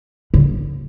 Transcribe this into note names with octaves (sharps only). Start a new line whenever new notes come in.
D3